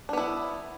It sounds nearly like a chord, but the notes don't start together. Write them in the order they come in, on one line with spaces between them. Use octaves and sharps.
D4 B3 E4